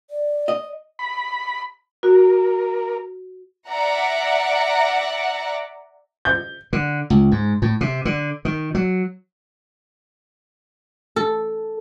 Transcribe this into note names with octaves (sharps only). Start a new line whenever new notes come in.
D5
D#5
B5
F#4 A#4
D5 E5 F#5 A#5
G6
D3
C#2
G#2
A2
C3
D3
D#3
F#3
A4